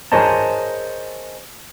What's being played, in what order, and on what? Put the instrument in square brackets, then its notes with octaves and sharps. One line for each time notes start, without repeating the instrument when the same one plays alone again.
[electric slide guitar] G#4 A#4 C5 C#5 D#5 A5